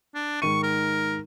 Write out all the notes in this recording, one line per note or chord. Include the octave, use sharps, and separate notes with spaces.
D4
G#2 D#3 C#6 D#7
A#4